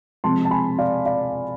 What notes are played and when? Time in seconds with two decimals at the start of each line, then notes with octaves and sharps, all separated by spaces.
0.24 C3 F3 G#3 C4 A5 C6
0.45 A5
0.51 G#5 B5
0.78 D5 F5
1.06 D5 F5